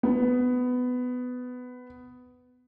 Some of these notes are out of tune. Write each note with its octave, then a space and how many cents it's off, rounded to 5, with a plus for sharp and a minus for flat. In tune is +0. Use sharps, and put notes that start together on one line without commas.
B3 +15